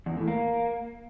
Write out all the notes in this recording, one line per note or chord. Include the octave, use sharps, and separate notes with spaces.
E2
A2
A#3